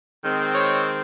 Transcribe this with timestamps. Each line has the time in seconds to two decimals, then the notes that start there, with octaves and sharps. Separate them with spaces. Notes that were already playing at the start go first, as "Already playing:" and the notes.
0.24 D#3 G#3 C4
0.54 C#5